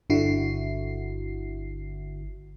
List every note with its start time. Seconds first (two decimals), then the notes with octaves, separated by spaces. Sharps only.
0.10 G1 D3 E4 F#4 C7